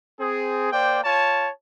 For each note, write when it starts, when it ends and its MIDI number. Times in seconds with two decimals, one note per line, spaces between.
0.20 0.69 60
0.20 0.69 68
0.72 0.99 58
0.72 0.99 72
0.72 0.99 74
0.72 0.99 79
1.04 1.49 65
1.04 1.49 73
1.04 1.49 81